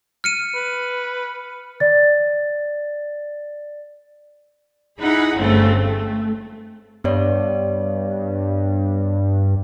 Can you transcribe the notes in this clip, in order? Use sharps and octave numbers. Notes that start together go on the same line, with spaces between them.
F6 C#7 D#7
B4
D5 A6
D#4 E4 G#4 F#5 B5
G1 G2 C#3 A3 C4
A3
G2 B3 C#5 D5